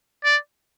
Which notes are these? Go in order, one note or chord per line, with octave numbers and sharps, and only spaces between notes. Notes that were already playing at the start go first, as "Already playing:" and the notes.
D5